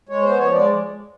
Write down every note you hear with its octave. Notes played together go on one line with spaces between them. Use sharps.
G#3 C#5
B3 C5
F3 C#5
G#3 D5